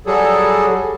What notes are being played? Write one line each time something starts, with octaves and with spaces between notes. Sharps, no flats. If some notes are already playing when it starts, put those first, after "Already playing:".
F#3 G3 G#4 A4